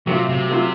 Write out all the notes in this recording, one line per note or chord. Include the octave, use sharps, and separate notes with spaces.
C3 F#3 A3 C4 F4
C3
F#3 A3 C4 F4